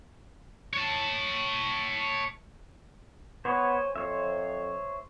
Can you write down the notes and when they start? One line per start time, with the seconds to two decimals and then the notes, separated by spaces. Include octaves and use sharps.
0.74 C#5 A5
3.45 B3 C5 C#5 G#5
3.96 F2 C5 C#5 E5